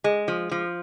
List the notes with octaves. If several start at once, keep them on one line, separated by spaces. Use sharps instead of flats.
G#3
F3
F3